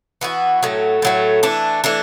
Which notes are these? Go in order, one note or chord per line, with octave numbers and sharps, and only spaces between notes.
E3 B3 F#4
A2 F#3 A3
A2 F#3 A3
E3 A3 D4
E3 A3 D4